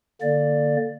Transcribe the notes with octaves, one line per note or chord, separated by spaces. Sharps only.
D3 A#3 D5